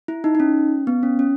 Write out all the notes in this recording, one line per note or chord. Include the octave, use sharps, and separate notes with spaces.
E4
D#4
D#4
C#4
B3
C#4
C#4